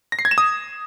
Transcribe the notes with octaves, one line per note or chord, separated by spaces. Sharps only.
A#6
C7
G#6
E7
D#6